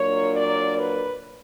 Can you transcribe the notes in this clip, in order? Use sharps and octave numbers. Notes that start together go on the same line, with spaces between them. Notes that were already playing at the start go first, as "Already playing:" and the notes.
Already playing: A#2 F#3 A#3 D4 C#5
D5
B4